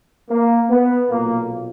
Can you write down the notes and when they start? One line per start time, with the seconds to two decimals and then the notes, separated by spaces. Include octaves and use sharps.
0.29 A#3
0.70 B3
1.10 B1 A#2 A#3